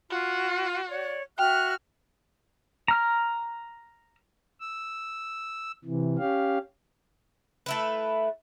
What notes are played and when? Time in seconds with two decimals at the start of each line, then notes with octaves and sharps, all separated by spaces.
0.11 F4 F#4
0.90 C#5 D5
1.39 F#4 E5 G5 F6 F#6
2.88 A#5 F6
4.60 E6
5.85 C3 E3
6.18 C#4 G4 F5
7.66 A3 E4 B4